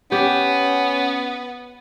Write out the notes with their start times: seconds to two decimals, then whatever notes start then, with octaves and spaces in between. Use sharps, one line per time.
0.12 B3 C#4 G4